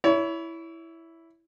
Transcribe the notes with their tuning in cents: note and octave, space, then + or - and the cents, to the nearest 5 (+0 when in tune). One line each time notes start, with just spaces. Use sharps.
E4 +0 C#5 +30